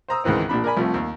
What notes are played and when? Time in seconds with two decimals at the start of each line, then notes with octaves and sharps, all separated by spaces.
0.08 C5 A#5 D#6 E6
0.24 C#2 G#2 D#3 E3 C4
0.49 A#1 A#2 D4 B5
0.64 A#4 D5 G#5 B5
0.77 C2 F3 A3
0.94 D#2